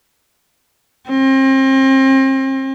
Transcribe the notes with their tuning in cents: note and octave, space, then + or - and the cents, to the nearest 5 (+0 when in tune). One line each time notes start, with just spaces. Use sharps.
C4 +35